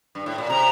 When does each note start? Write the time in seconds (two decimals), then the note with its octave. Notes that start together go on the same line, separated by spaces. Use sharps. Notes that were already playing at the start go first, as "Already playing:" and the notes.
0.15 G2
0.26 A2
0.38 A#2
0.49 C3 A#5